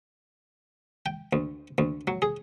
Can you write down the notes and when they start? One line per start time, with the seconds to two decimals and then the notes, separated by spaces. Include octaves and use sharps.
1.06 G5
1.33 D2
1.78 D2
2.07 F#3
2.22 G#4